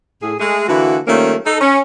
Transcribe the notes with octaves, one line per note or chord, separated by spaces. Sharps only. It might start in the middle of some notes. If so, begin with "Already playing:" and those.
A2 G#4
G#3 A3 G#4
D3 E3 A#3 E4 F#4
D#3 F3 G3 A3 A#3 C#4
D#4 A4
C#4